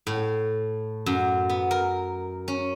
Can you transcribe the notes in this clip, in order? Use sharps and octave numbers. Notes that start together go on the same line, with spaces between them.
A2
F#2
B3
A#4
C#4